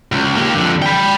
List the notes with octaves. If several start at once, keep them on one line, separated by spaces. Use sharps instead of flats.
C#2
A#3 G4
F2 D3
G5 B5